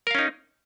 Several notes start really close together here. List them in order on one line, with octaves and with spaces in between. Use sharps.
A#4 F5 C#4 D#4